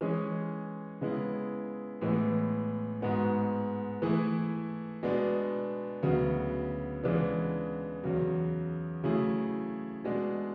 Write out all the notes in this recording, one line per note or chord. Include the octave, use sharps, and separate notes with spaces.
E3 G#3 C#4 G#4
C#3 G#3 B3 E4
A2 E3 G#3 B3
G#2 G#3 B3 F#4
E3 A3 E4 G#4
B2 G#3 B3 D4
D2 C#3 F#3 B3
C#3 E3 G#3 B3 D4
E2 C#3 F#3
C#3 F#3 A3 E4 G#4
B2 G#3 D4